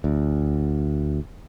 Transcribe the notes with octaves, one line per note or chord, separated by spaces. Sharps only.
D2